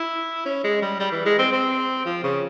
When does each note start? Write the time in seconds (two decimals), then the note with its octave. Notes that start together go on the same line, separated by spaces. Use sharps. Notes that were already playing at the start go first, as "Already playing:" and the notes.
Already playing: E4
0.45 C#4
0.64 G#3
0.82 G3
1.00 G3
1.12 E3
1.26 G#3
1.39 C4
1.53 C4
2.06 F3
2.24 C#3